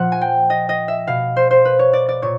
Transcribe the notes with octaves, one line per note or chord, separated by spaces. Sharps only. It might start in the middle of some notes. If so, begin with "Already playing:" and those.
Already playing: A#2 F3 F#5
G#5
G5
D#5
D#5
E5
B2 F5
C5
C5
B4
C#5
D5
D5
A#2 C#5